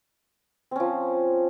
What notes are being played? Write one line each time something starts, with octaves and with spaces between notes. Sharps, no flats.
F3 C4 C#4